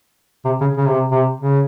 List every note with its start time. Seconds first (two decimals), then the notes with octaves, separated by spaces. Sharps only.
0.45 C3
0.61 C#3
0.77 C#3
0.88 C3
1.12 C3
1.41 C#3